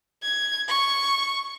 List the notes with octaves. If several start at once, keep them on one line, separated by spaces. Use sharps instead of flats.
G#6
C#6